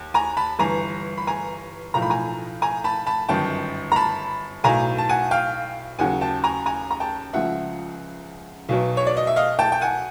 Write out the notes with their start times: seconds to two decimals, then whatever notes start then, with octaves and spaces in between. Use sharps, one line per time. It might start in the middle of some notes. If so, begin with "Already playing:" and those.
Already playing: D#2
0.14 G#5 A#5
0.37 A5 B5
0.59 G1 G2 E3 G#5 A#5
1.18 B5
1.27 G#5 A#5
1.94 B1 A2 F3 A#5
2.02 B5
2.10 G#5 A#5
2.62 G#5 A#5
2.84 A5 B5
3.07 A5 B5
3.29 G1 F#2 D#3 G5 A5
3.92 A#5
3.96 A5 B5
4.64 B1 A2 F#3 G#5 A#5
4.98 A5
5.09 F#5 G#5
5.31 F5 G5
5.99 D#2 C#3 F#3 F#5 G#5
6.21 G5 A5
6.44 G#5 A#5
6.66 G#5 A#5
6.91 A#5
7.00 G5 A5
7.33 C#2 C#3 F3 E5 F#5
8.69 B1 B2 F#3
8.97 C#5
9.07 D5
9.17 D#5
9.27 E5
9.36 D#5 F5
9.59 G5 A5
9.72 G5
9.81 F#5 G#5